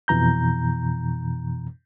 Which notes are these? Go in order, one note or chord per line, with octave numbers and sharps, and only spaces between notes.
F2 B2 E3 A#5 G6